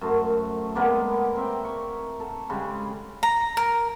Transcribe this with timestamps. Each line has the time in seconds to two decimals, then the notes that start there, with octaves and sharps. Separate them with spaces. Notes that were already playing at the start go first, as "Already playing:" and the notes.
0.01 F#2 A3 C5
0.75 G#3 A#3 B3 D5
1.36 C4 E5 G5
1.65 C#6
2.20 A4
2.49 C#3 G3 G#3 B5
3.23 A#5
3.57 A#4